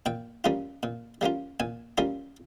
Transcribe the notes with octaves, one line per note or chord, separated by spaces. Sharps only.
A#2 G5
G3 A#3 C#4 F4
A#2
G3 A#3 C#4 F4
A#2 G#5
G3 A#3 C#4 F4